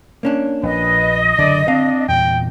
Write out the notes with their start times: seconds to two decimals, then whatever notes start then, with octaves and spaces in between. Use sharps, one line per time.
0.23 A#3 C#4 D4
0.63 A#1 B4 D#5
1.39 F#1 D3 D5
1.68 C4 D4 F5
2.08 E2 A#2 G5